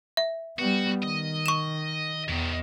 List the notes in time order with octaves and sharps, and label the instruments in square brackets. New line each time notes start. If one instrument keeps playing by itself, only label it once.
[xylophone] E5
[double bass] G3 B3 [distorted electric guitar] F#4
[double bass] D#3 [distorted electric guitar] D#5
[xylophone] C#6 E7
[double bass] E2 [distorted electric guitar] B2 D#3